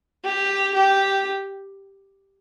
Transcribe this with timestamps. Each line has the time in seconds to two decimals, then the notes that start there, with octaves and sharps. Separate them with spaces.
0.24 G4
0.74 G4